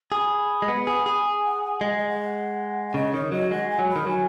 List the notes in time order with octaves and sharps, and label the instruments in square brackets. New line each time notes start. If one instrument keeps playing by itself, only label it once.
[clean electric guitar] G#4 [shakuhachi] B5
[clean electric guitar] G#3
B3
G#4
G#4
[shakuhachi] G#5
F#5
G#5
[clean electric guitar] G#3 [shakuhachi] F#5
[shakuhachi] D#5
F#5
F#5
[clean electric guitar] C#3 [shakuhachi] D#5
[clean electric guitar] D#3 [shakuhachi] C#5
[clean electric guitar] F#3 [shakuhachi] D#5
[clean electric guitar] G#3 [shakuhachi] F#5
[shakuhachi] G#5
[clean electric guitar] F#3
[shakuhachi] B5
[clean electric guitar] D#3
[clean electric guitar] F#3 [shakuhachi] G#5